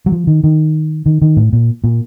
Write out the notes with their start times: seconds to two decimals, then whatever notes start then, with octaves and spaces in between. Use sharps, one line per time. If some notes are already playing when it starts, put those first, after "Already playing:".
0.06 F#3
0.12 F3
0.27 D#3
0.44 D#3
1.06 D#3
1.22 D#3
1.37 A2
1.53 A#2
1.84 A#2